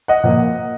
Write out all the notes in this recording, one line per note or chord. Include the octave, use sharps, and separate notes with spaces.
D#5 F#5
A#2 F3 A#3